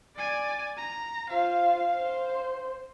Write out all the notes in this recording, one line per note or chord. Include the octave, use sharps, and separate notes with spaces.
D5 G#5
A#5
F4 C5 F5
C5